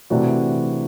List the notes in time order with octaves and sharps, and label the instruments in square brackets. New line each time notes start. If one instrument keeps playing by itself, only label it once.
[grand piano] C3 E3 A3 D4 F#4